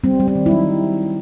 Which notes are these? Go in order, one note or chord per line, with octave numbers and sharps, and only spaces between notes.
G3 C4
G3
C4
D#3
E4
F#3 D#4